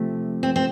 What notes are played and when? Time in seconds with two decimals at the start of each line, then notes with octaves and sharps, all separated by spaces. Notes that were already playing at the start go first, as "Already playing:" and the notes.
Already playing: C3 F3 A3
0.43 C4
0.56 C4